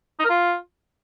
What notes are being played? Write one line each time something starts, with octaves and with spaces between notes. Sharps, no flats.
D#4
A#4
F4